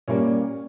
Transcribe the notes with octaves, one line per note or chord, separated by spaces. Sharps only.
A#2 G3 A#3 C#4